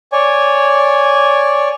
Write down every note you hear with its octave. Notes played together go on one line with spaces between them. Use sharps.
C#5 D5 G#5